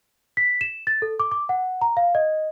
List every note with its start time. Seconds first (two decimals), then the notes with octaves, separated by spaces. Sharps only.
0.37 B6
0.61 E7
0.87 A6
1.02 A4
1.20 D6
1.31 D6
1.49 F#5
1.81 A#5
1.97 F5
2.15 D#5